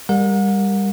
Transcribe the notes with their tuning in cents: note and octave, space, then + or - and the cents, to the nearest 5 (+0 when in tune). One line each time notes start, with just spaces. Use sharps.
G3 +20 A#4 +0 F#5 -40